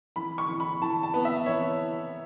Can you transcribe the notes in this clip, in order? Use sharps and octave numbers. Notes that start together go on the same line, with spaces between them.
E3 B5
C#6
E3
B5
E3 A5
A5
B3
E5
E3 C#5